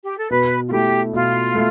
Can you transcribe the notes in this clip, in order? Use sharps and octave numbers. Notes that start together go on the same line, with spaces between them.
G4
A4
B2 B4
F4
A3 E4 G4
B2 F4
A3